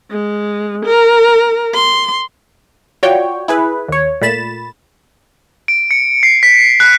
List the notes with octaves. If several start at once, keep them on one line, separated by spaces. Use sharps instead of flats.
G#3
A#4
C6
F4 F#4 C#5 D5 G5
E4 G#4 B4
D#2 C#5
A#2 A3 B5 A6 E7
D7
C#7
C7
B6
F#6